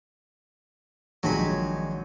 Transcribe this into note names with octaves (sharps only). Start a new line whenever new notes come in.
A#1 D#3 F#3 G#3 B5